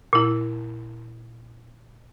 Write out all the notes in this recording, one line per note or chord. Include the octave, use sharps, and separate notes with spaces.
A#2 E4